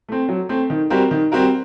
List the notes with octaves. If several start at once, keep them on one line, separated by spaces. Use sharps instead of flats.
A3 C4
F#3
A3 C4
D#3
G3 C4 F#4 A#4
D#3
G3 C4 F#4 A#4